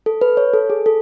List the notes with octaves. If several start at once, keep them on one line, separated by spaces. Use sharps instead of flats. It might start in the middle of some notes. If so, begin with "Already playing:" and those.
A4
B4
C#5
A4
G#4
A4